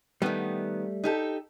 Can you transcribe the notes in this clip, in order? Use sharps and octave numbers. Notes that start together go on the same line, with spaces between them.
D#3 G3 A3 B3
D#4 G4 A4